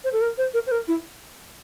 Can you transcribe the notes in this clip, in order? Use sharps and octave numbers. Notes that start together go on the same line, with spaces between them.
C5
A4
A#4
C5
A#4
C5
A#4
E4